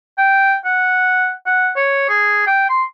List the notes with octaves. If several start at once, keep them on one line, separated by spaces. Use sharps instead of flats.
G5
F#5
F#5
C#5
G#4
G5
C6